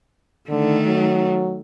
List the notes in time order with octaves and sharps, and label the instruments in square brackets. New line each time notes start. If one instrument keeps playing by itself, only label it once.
[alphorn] D3 [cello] D#3 A3
[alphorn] F#3